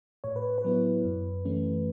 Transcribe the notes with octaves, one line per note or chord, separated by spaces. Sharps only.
A2 C#5
B4
B4
F#3 B3 E4
F#2
E3 A3 C#4